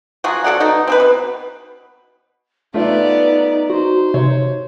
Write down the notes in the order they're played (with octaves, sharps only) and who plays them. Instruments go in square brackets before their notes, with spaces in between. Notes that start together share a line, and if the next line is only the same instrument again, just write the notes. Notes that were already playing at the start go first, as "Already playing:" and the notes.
[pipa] F3 F#3 F#4 G#4
F#4 A4 D5 F#5
B2 D#4
C4 G#4 B4
B2
[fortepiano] A3 F4 E5 [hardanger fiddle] B3 D5 [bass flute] D#4
[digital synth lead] F#4 [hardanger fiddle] C5
[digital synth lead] C3 [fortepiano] C#5